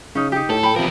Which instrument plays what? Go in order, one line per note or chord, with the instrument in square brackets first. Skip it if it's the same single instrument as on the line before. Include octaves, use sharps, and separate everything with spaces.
[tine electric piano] C#3 [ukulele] C#4 D#4
[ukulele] D#4 G4
[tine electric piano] A2 [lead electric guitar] A4
[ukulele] G5 B5
[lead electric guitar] E2 A#4 [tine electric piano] C3 F3